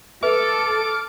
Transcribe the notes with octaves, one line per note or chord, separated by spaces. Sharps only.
A4 B4 E5 D6 F6